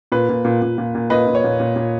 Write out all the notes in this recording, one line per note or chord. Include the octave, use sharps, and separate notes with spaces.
A#2 B4
A#2
A#2
A#2
A#2
A#2
A#2 B4 D#5
A#2
C#5
A#2
A#2
A#2